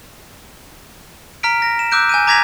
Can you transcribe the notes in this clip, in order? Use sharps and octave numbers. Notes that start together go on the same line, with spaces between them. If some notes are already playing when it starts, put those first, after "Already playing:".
A#5 F6 B6 D7
A#6
E7
D6 E6 F#6 G6 D7
G#5 G6 D#7
A#5 D6 G#6 A#6 B6 F7